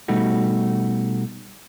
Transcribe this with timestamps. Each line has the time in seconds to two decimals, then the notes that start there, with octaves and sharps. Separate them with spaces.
0.08 B2 G3 A3 D#4 F#4